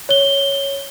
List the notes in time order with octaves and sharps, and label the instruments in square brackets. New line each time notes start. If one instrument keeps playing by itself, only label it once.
[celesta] C#5 G7